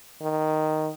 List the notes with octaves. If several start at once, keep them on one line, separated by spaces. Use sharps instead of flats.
D#3